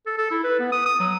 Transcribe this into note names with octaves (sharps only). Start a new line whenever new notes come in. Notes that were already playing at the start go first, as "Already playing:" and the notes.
A4
A4
E4
B4
B3
D#6
D#6
F#3